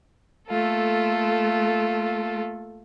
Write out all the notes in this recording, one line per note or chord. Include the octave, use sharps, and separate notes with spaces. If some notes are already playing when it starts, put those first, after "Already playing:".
A3 A#3 F4 A4